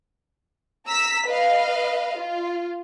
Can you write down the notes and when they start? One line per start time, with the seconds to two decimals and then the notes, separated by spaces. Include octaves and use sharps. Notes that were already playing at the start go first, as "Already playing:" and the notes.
0.88 A#5 E6 B6
1.27 B4 D#5 F5
2.18 F4